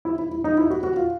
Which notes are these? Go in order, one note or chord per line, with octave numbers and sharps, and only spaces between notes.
E4
E4
E4
D#4
E4
F#4
F#4
F4